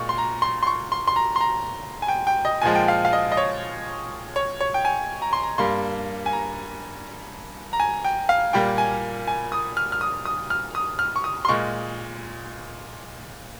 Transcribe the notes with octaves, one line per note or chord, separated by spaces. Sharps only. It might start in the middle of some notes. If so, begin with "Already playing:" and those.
Already playing: A#2 G#3 C#6
C6
A#5
C6
C6
C#6
C6
C6
A#5
C6
A#5
G#5
G5
G5
D#5
A#2 F3 G#3 G#5
G5
F5
F5
D#5
D#5
C#5
C#5
C#5
G5
G#5
A#5
C6
A#5
G2 G3 A#3 C6
G#5
A#5
A#5
G#5
G5
F5
A#2 G3 A#3 G5
G#5
G#5
D#6
F6
F6
D#6
D#6
F6
D#6
F6
C#6
D#6
C6
A#2 G#3 C#6